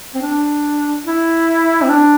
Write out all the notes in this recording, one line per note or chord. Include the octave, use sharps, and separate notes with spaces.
C4
D4
E4
C4
D4